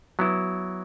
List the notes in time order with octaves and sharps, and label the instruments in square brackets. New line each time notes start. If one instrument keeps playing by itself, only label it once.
[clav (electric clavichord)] F#3 B3 E4